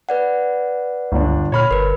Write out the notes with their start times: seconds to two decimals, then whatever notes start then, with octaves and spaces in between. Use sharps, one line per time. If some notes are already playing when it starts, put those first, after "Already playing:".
0.09 B4 D5 F#5
1.12 G1 C#2 D4
1.52 A#2 C#5 B5 F6
1.71 G1 A#4 B4